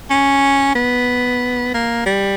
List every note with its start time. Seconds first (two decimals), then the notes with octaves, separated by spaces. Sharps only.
0.10 C#4
0.75 B3
1.74 A#3
2.06 G3